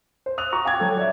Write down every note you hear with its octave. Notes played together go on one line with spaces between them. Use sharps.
C5
D#6 E6 F#6 F7
F#4 A#5 C#6
F5 G5 D6 G#6
F#3 A4
C#5 D5 E5